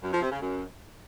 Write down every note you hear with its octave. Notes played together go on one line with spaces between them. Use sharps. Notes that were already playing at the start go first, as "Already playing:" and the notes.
F#2
F3
C3
C#3
F#2